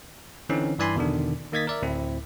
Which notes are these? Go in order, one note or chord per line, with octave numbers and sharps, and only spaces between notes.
D3 E3 C4 C#4 D#4
G2 E3 D5 G#5 B5 C6
E2 B2 D3 D#3 D4
D#3 A#3 D#5 G#6 A6 B6
A#4 D5 E5
D2 A2 C4 E4